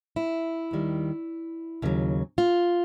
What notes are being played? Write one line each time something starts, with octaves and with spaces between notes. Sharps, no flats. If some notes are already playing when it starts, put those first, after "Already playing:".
E4
D#2 D#3 G3
D#2 C#3 F#3
F4